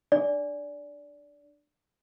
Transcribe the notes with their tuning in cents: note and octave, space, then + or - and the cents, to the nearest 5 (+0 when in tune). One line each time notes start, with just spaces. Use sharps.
D4 +15 D5 -20